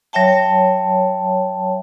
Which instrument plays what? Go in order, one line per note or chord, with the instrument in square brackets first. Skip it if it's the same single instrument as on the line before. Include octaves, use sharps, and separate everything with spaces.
[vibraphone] F#3 C#5 E5 G5 A5